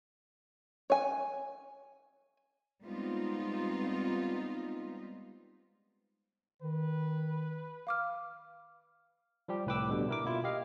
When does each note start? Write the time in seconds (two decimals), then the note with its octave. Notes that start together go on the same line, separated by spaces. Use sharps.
0.90 C#5 G#5
2.83 G3 G#3 B3 C4 D#4 F4
6.62 D#3 B4
7.87 F5 D6 F6
9.48 F3 G3 G4
9.66 C2 A2 B4 G5 D6 E6
9.91 B2 D3 G3
10.09 E4 A#4 D6
10.25 B2 A#3 E4 F4
10.44 G4 D#5 F5